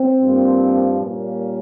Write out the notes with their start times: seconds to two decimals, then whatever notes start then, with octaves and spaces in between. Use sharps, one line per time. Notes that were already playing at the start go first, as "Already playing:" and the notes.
Already playing: C4
0.20 G2 F3 A#3
1.00 A#2 G3 A#3 C#4